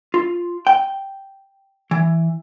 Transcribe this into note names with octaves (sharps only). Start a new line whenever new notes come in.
F4
G5
E3